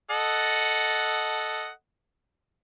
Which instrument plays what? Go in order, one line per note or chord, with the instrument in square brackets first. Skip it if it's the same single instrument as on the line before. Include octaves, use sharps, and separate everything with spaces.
[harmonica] A4 D#5 F#5